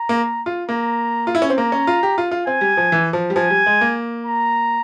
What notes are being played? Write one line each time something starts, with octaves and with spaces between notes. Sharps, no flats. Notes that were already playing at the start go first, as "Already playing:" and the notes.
Already playing: A#5
A#3
F4
A#3 A#5
F4
E4
C#4
C4
A#3 A#5
C#4
F4
G4
F4
F4
C4 G#5
G3
F3
E3
F3
G3
F3 G#5
G3
G#3
A#3
A#5